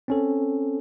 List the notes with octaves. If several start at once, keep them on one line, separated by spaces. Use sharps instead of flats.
C4 C#4 A4